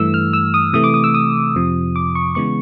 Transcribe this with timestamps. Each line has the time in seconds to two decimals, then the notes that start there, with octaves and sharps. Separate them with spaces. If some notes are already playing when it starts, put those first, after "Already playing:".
Already playing: G2 E3 A3 E6
0.14 F6
0.33 E6
0.54 D#6
0.73 C3 E3 A3 D#6
0.84 D6
0.94 D#6
1.04 E6
1.14 D#6
1.55 F2 C3 F3
1.96 D6
2.15 C#6
2.35 C#3 E3 G#3 B3 C#6